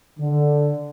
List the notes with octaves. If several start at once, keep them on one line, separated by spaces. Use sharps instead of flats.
D3